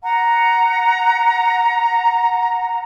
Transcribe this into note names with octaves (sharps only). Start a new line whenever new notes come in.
F#5 A#5